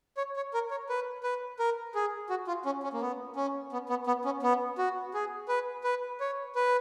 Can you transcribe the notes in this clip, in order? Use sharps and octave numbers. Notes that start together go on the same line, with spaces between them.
C#5
C#5
A#4
C#5
B4
B4
A#4
G#4
F#4
F4
C#4
C#4
A#3
B3
C#4
B3
B3
B3
C#4
B3
F#4
G#4
B4
B4
C#5
B4